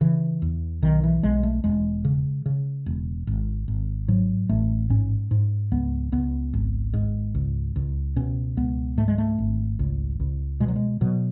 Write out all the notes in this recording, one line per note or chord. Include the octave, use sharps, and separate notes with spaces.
C#3 E3
E2
B1 D#3
E3
B1 G#3
A3
E1 G#3
C#3
C#3
E1
G#1
G#1
G#2 F#3
A1 A3
G#2 C#4
G#2
C#2 B3
C#2 B3
G#1
G#2
C#2
C#2
B2 C#4
C#2 B3
G#2 A3
G#3
A3
G#1
C#2
C#2
B2 G#3
F#3
G#3
B2 F#3